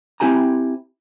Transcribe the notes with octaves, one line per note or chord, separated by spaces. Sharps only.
C4 D4 E4 G4 G#5 A#5